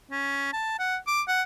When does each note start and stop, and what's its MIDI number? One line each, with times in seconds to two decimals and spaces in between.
0.11 0.52 61
0.53 0.75 81
0.79 0.97 78
1.07 1.22 86
1.28 1.42 78